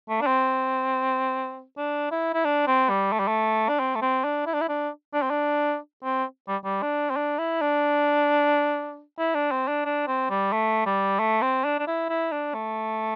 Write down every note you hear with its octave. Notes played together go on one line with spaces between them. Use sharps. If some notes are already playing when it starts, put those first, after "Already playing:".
A3
D4
C4
D4
E4
E4
D4
C4
G3
A3
G3
A3
D4
C4
A3
C4
D4
E4
D4
E4
D4
D4
C4
D4
C4
G3
G3
D4
C4
D4
E4
D4
E4
D4
C4
D4
D4
C4
G3
A3
G3
A3
C4
D4
D4
E4
E4
D4
A3